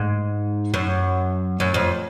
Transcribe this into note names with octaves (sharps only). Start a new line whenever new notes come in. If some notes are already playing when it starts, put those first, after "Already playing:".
Already playing: G#2
F#2
F#2
F2